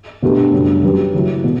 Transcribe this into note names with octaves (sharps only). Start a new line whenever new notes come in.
B2 A3 D4 G4 B4
F#2 C#3 G3 D4
F#3 C#4 G4 B4
C#3 F#3 A3 E4
B2